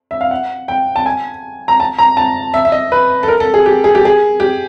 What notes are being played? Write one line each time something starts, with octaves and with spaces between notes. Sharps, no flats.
E5
F5
F#5
G5
A5
G#5
A#5
A5
A#5
A5
E5
E5
D#5
B4
A4
A#4
A4
G#4
G4
G#4
G4
G#4
G4